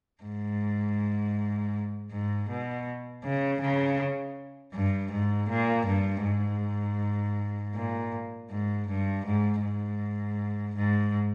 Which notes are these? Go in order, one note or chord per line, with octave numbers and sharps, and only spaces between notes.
G#2
G#2
B2
C#3
C#3
G2
G#2
A#2
G2
G#2
A#2
G#2
G2
G#2
G#2
G#2